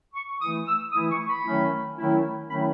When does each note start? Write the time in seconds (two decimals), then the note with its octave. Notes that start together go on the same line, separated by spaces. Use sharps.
0.13 C#6
0.40 E3 A3 E4 D#6
0.66 E6
0.92 E3 A3 E4 D#6
1.10 C#6
1.27 B5
1.44 D#3 F#3 A3 C#4 E4
1.97 D#3 F#3 A3 C#4 E4
2.48 D#3 F#3 A3 C#4 E4 B5